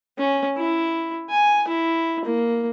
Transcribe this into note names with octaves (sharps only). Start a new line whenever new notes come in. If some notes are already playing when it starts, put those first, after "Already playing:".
C#4
E4
G#5
E4
A#3